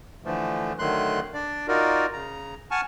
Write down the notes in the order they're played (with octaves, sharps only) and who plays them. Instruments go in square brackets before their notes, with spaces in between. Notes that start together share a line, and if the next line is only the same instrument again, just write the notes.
[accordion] D3 E3 F3 A3
D3 D#3 F#3 A3 C6 F#6
D4 D5
D#4 F4 F#4 A#4 D5
C#3 A#5
F#5 G#5 A5 C#6 F6